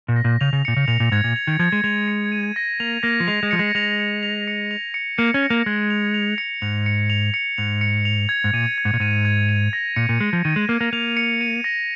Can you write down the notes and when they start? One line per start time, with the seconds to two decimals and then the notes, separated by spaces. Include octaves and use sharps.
0.08 A#2
0.16 A#6
0.24 A#2
0.41 C#3 F7
0.53 C#3
0.65 A#2 C#7
0.76 C#3
0.88 A#2 F7
1.00 A#2
1.12 G#2 G#6
1.24 A#2
1.36 F7
1.47 D#3
1.59 F3 G#6
1.72 G#3
1.84 G#3 F7
2.08 C#7
2.32 D#7
2.56 A#6
2.80 A#3 F7
3.03 A#3 A#6
3.20 F3
3.28 G#3 F7
3.43 G#3
3.51 F3 C#7
3.59 G#3
3.75 G#3 F7
4.00 C#7
4.23 F7
4.48 C#7
4.71 F7
4.94 C#7
5.18 A#3 C#7
5.34 C#4
5.43 A#6
5.50 A#3
5.66 G#3 G#6
5.90 F7
6.14 F7
6.38 C#7
6.62 G#2 F7
6.86 C#7
7.10 F7
7.34 C#7
7.58 G#2 F7
7.81 C#7
8.05 F7
8.29 G#6
8.44 G#2
8.53 A#2 D#7
8.78 G#6
8.85 G#2
8.93 A#2
9.00 G#2 D#7
9.25 G#6
9.49 D#7
9.73 A#6
9.96 A#2 C#7
10.09 A#2
10.20 G#3 A#6
10.33 F3
10.44 D#3 D#7
10.56 G#3
10.69 A#3 A#6
10.81 A#3
10.93 A#3 F7
11.17 C#7
11.41 D#7
11.64 A#6